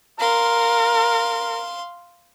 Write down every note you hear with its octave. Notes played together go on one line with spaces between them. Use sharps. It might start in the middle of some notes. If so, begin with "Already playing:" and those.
A#4 F5 C6